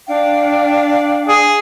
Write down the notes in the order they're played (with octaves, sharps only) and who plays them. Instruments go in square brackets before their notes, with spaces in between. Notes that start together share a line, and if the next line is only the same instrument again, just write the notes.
[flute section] D4 F5 G5
[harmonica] G#4